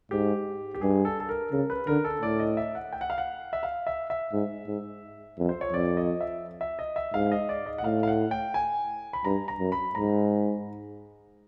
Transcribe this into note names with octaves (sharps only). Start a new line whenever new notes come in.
G#2 G4
G4
G2 G#4
A4
A4
A#4
C#3 A#4
B4
D3 A#4
A4
A2 D5
D#5
E5
F#5
G5
F#5
F5
F#5
E5
F5
E5
E5
G#2
G#2
F2
C5
C#5
F2 D5
D#5
E5
E5
D#5
E5
G#2 F5
D#5
D5
D#5
F#5
A2 F5
F5
F#5
G5
G#5
B5
G2 A#5
A#5
F#2
B5
G#2 A#5